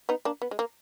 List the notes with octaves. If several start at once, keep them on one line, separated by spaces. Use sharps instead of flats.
B3 D#4
A#3 D4
B3
G#3
A#3